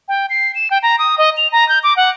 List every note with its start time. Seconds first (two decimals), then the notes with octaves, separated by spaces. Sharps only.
0.08 G5
0.30 C7
0.55 E7
0.71 G5
0.83 A#5
0.99 D#6
1.18 D#5
1.37 F7
1.52 A#5
1.69 G6
1.83 D6
1.96 F#5